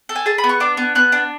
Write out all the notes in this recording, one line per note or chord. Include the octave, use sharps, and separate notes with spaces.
A4
G#5
G#4 A5
B5
B3
C#6
D4 D6
B3
B3 F#6
D4